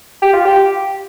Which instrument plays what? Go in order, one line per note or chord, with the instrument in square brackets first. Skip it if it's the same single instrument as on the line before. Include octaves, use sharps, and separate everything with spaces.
[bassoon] G4
F4
G4